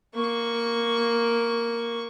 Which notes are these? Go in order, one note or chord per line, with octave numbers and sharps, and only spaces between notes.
A#3 C#6